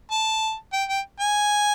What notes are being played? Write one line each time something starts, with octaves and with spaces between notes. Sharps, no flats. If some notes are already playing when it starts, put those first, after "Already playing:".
A5
G5
G5
G#5